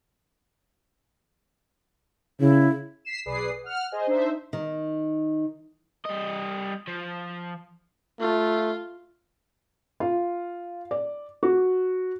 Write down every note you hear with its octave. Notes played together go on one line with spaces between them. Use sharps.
C#3 E4
B6 C7 E7
B1 G#4 B4 D5 D#6 C7
F#5 F6
G#4 C5 D#5 G#5
D4 D#4 C5 E5
D#3
G3 D#5
F3
A3 F4
F4
D5
F#4